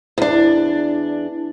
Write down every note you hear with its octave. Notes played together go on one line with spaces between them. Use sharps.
E2 D4